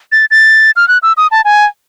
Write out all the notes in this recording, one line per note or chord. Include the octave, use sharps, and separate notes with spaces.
A6
A6
F6
F#6
E6
D#6
A5
G#5